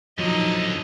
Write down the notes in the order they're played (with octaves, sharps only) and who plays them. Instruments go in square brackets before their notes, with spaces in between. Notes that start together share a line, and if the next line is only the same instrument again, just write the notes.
[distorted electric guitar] F2 D3 [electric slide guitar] F3 F#3 [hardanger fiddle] D#4 D#5